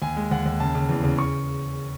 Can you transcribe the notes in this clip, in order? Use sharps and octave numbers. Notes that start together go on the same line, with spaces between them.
D#2 G#5
G#3
D#2 F#5
D#2
C#3 A5
C#3
E2
C#3
C#6